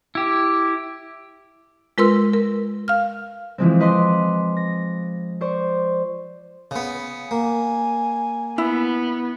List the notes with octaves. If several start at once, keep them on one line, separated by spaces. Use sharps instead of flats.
E4 G4
G#3 F4 A#4 B4 C6 E6
A#4
F5 F6
E3 F3 G#3 C4
B4 D#5 C6 D6
A#6
C5 D5 C#6
C#3 B3
A#3 G#5
B3 E4